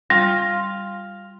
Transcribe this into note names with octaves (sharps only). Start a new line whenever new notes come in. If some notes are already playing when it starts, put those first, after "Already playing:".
G3 F4